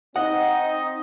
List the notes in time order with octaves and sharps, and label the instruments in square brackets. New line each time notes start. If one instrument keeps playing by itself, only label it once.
[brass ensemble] C4 D#4 [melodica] D#5 [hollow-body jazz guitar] F#5